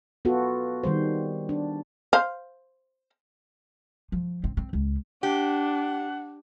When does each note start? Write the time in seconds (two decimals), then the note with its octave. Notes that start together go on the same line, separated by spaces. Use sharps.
0.25 B3 F4 F#4 A4
0.84 D#3 G3 C5
1.49 D4
2.13 C5 F5
4.12 F3
4.44 C4
4.57 C4
4.73 C#2
5.23 D4 G4 F#5